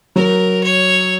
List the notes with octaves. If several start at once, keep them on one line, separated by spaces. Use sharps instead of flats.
F#3 A#4
C#5